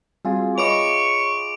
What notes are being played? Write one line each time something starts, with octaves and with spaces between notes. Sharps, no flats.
G3 C4 F4 F#4 G#4
B4 C#5 D#5 E5 C#6 D6 D7 F7